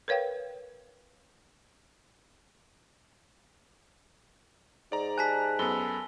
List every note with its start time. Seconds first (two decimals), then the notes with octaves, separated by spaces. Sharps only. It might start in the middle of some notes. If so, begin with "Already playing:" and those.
0.08 A#4 B4 C#5 F5 G5
4.92 G#2 D5 A#5
5.18 G4 G#5 A5 F#6 B6
5.59 F#2 B3 A4 B5 E6 G7